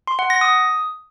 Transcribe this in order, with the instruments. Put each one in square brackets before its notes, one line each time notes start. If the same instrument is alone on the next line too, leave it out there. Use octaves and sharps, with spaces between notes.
[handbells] C6
F#5
A#6
D#6